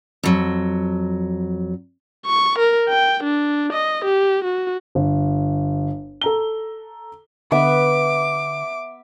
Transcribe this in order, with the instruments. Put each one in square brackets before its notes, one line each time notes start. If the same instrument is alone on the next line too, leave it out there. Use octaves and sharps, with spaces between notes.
[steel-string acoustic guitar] F2 F#3
[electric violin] C#6
A#4
G5
D4
D#5
G4
F#4
[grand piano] G1
A4 A#5 G7
[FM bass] D3 [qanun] B3 [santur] E5 [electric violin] D6